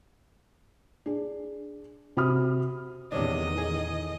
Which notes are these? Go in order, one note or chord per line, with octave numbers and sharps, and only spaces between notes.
D4 G#4
C3 F#4 B5 D#6 F6
E2 A2 C3 D#3 C#4 D4 D#5
G#4